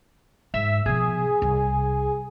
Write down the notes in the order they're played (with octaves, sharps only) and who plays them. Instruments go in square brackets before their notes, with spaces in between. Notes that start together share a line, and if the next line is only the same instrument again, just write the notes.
[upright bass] G#2 [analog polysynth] E5
[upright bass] B2 F3 [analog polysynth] G#4
[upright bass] C2